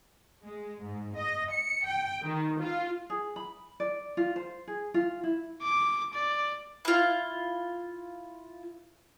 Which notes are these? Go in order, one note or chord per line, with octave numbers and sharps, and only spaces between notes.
G#3
G#2
D#5
C#7
G5
D#3
F4
G#4
B5
D5
F4
C5
G#4
F4
E4
D6
D5
E4 F4